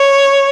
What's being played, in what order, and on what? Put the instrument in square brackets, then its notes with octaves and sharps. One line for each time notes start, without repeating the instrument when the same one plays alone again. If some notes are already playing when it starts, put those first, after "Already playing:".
Already playing: [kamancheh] C#5